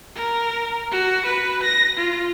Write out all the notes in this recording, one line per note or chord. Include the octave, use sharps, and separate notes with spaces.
A#4
F#4
B4
A#6
F4